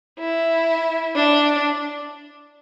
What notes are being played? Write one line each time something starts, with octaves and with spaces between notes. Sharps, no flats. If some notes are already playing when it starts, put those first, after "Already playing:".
E4
D4